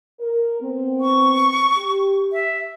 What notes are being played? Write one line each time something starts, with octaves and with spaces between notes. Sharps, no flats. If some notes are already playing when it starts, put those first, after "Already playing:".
A#4
B3 C4
C#6
G4
E5